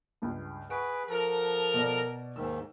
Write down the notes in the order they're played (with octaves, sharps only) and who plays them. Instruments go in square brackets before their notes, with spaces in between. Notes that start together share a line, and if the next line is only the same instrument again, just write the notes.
[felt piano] C#2 G2
[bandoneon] G#4 B4 [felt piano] F#5 C#6 D7
[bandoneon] F3 A4 [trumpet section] A#4
[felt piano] B2 D5
[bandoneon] D#2 G#2 D#3 [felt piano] E6